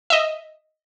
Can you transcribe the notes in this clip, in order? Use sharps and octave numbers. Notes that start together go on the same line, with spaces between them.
D#5 E5